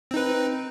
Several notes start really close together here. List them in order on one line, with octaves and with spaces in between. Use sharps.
C4 D#4 B4